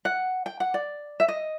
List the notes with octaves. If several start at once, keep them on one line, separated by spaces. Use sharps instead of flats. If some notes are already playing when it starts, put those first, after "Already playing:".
F#5
G5
F#5
D5
E5
D#5